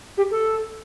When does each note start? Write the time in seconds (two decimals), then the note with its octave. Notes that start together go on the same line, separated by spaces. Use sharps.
0.17 G4
0.31 A4